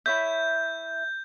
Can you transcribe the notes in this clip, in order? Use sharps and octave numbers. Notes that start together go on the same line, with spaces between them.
E4 C#5 E5 G6